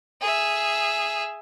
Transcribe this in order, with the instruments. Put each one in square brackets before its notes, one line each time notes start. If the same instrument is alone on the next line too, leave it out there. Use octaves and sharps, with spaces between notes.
[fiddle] G#4 E5